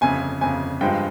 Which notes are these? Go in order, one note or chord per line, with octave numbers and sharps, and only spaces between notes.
G1 F2 C#3 G#5
G1 F2 C#3 G#5
G2 F3 G#3 G5